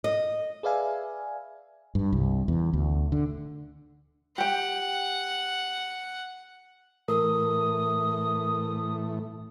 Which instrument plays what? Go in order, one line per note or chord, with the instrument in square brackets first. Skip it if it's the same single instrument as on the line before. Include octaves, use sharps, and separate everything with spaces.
[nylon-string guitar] D#5
[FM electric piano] G#4 B4 D5 E5 F5 G#5
[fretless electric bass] G2
C2
E2
D2
D3
[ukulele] G4 G5 [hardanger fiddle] F#5
[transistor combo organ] A2 E3 A3 [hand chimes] A#4 [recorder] D#6